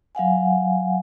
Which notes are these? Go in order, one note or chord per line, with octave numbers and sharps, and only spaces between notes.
F#3 F5 F#5 G#5